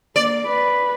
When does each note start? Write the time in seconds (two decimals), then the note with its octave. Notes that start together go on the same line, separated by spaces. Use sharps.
0.16 A#3 D5
0.47 B4